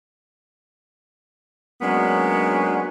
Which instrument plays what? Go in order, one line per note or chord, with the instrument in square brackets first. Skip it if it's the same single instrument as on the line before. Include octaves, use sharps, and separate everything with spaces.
[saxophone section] F#3 G#3 A#3 B3 C#4 D4